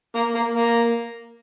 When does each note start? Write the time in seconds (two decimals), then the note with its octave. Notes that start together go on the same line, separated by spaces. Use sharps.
0.15 A#3
0.35 A#3
0.55 A#3